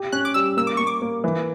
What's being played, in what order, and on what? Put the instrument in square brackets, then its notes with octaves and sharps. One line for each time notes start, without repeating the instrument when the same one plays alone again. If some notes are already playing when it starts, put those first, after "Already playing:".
Already playing: [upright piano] G4
[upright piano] C#4 [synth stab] F#6
[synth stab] D6
[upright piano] G3 [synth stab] E6
[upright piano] A#3 [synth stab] E6
[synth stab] D6
[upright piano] A#3 [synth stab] C#6
[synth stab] D6
[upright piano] A#3
E3